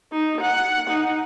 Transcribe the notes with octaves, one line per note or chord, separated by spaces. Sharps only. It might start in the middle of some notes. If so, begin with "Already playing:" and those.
D#4
F#5
D#4